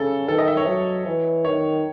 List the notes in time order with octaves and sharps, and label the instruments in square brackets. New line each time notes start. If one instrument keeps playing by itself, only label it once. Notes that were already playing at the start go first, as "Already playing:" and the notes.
Already playing: [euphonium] C#3 [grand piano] A4
[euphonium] D#3 [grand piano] A4
[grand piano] D#5
E5
C#5
[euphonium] F#3
E3
[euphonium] D#3 [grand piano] C#5